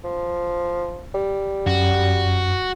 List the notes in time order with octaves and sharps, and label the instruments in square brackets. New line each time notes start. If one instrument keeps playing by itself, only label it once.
[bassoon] F3
G3
[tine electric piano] F#2 [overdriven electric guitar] F#4